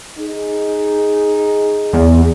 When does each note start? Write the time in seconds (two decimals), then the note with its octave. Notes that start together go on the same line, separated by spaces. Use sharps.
0.19 D#4 G#4
1.93 E2